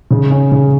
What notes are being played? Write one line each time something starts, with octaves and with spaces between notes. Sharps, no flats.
C#3
C#4
C#3